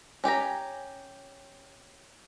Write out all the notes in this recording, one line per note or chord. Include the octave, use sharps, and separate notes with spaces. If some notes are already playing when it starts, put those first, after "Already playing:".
C#4 G4 G#5 A#5